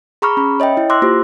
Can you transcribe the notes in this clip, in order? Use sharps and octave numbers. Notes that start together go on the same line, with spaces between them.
G#4 A#5 B5 C#6 D6 F6
C#4 B5
C#5 D#5 E5 G5
E4
C6 D6 E6 F#6 A#6
A#3 F4 G4 C5